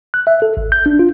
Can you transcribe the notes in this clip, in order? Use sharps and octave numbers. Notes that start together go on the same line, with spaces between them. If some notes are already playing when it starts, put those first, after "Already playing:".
F#6
E5
A4
G#1
G6
D4
F4